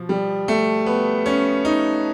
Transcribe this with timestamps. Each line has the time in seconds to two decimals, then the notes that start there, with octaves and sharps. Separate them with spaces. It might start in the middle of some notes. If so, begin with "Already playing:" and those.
Already playing: B2 F3
0.09 G3
0.48 A3
0.86 B3
1.26 C#4
1.65 D#4